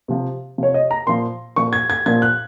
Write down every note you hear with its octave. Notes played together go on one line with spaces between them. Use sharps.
C3 F3
C3 F3 C#5
D#5
A#5
A#2 F3 C6
A#2 F3 C#6
G#6
G#6
A#2 F3 G#6
F#6